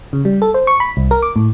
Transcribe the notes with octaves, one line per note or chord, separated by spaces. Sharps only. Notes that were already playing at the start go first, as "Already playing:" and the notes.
C#3
G3
A4
C5
C#6
B5
C2
A#4
D6
A2